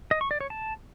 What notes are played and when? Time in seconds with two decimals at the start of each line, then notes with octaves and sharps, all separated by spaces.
0.11 D#5
0.21 C#6
0.31 D5
0.40 C#5
0.50 A5